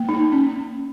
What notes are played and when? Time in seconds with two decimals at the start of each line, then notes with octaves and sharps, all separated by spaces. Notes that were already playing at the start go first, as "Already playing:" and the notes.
Already playing: A#3
0.09 D#4
0.32 C#4